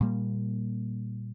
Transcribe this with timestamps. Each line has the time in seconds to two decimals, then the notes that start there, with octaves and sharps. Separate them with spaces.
0.01 A#2 G3 A#3